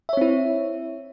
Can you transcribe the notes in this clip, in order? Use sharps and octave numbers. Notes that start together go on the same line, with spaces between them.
C4 E4 C#5 E5